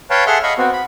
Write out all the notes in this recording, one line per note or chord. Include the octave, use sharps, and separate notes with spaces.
B4 C#5 F5 G5 A5
G#4 A4 E5 F#5 C6 F6
D#5 F5 B5 C#6
B3 C4 F#4
B5